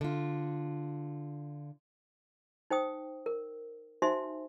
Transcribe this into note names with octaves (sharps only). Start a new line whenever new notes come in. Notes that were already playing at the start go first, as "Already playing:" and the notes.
D3 F4
D#4 C5 G5 D#6
A#4
D#4 F#4 C5 E5 G#5 C6